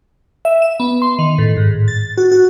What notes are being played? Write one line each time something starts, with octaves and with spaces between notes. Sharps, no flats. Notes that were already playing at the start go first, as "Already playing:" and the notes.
E5
E7
B3
C6
D#3
A2
G#2
A6
F#4
F#4